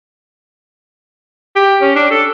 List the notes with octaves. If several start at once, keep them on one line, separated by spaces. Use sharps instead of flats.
G4
C#4
D4
A4